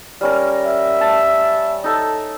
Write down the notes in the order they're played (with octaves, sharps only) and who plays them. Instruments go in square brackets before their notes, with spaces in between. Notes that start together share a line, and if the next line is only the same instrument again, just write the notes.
[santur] G3 C#4 A#4
[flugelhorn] E5
[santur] A5
D#4 A4 E5